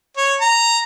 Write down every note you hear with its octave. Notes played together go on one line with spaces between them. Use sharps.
C#5
A#5